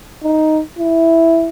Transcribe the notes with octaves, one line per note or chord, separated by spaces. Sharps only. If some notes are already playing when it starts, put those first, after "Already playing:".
D#4
E4